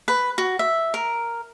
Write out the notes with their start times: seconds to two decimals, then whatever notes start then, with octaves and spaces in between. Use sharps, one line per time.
0.08 B4
0.38 F#4
0.59 E5
0.94 A#4